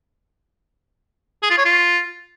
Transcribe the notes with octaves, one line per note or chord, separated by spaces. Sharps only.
G#4
F4
C#5
F4